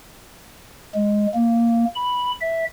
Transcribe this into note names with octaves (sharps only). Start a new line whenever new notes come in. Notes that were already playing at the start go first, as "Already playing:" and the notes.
G#3
A#3
B5
E5